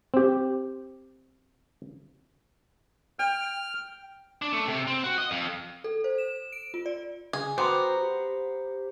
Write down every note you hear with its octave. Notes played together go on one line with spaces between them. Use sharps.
C4 G4
G5 F6
D4
A3
C3
C4
F#4
D#5
F2
A4
C5
E7
D7
F4
D5
C#3 G#4
B3 F#4 C5 F#5 G5 A#5 C6 D6
G4